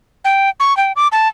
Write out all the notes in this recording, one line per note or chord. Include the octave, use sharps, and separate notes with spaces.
G5
C#6
G5
D6
A5